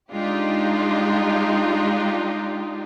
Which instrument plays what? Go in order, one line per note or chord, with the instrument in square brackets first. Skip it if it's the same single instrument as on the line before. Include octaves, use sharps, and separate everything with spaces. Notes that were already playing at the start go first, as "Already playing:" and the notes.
[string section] G#3 D4 D#4 F4 G4